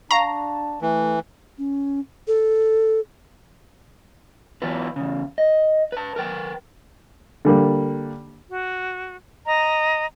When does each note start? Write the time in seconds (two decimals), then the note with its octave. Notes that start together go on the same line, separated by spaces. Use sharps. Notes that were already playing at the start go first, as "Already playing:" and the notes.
0.11 D4 F5 F#5 A5 A#5 C#6
0.82 E3 A3
1.58 C#4
2.27 A4
4.62 E3 F#3 B3 F4 B4
4.96 E2 C#3
5.38 D#5
5.92 B4 A5
6.16 A#4 B4 G5
7.45 D3 G3 A#3
8.49 F#4
9.46 D#5 A#5